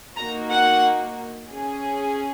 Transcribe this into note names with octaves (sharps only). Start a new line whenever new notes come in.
A#3 D#4 F#4 A#5
F#5
C#4 G#4